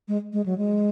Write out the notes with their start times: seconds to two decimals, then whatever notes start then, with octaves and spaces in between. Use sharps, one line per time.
0.08 G#3
0.33 G#3
0.46 F#3
0.58 G#3